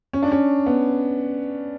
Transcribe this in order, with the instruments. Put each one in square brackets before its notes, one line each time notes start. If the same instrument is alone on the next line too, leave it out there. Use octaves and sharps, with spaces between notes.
[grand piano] C#4
D4
C#4
B3